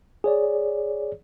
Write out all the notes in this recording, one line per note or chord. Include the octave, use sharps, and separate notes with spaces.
G#4 C#5 D5